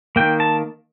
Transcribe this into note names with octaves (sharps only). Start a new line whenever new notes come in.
D#3 A#3 G5
A5